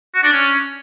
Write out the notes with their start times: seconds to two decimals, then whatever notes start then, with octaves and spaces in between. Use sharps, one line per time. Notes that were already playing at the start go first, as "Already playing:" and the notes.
0.14 F#4
0.23 D4
0.32 C#4